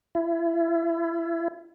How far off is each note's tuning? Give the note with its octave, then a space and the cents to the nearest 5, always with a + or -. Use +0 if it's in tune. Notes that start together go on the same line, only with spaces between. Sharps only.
E4 +30